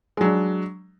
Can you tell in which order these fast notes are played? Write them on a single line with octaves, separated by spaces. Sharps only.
G#3 F#3 D4